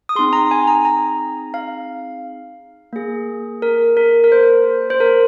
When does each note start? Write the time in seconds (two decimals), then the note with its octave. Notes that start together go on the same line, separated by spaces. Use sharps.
0.09 D#6
0.15 C4 D#4 G#4 C6
0.33 A#5
0.51 G#5
0.67 A#5
0.85 A#5
1.54 F5
2.93 A#3 G#4
3.62 A#4
3.97 A#4
4.24 A#4
4.32 C5
4.90 C5
5.00 A#4